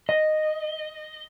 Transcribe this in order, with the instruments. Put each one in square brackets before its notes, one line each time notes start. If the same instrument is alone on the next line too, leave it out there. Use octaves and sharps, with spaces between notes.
[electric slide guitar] D#5